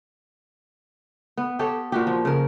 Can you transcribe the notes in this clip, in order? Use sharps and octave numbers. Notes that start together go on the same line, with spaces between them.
B3
G4 A4 C#5
A#2 F#4 G4
F3
C#3 A#4